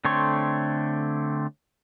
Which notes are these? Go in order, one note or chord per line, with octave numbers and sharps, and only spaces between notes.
D3 A3 C4 C#5 C6